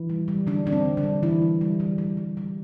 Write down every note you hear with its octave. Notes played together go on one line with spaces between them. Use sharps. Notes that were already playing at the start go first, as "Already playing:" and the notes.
Already playing: E3 E4
G3
G3
D3 G3 D4
G3 D4
C4
D3
D3 D4
G3
D3 E3 E4
G3
G3
G3
G3
G3
G3